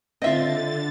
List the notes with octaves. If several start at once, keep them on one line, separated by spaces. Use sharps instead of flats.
D3 C4 F4 D#5 E5 A6